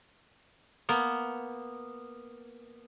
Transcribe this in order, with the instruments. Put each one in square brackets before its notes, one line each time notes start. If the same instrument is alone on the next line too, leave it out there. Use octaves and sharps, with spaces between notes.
[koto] A#3 B3